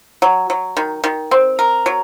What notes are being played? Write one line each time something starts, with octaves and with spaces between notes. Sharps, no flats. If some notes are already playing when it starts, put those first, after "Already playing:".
F#3
F#3
D#3
D#3
C4
A#4
F#3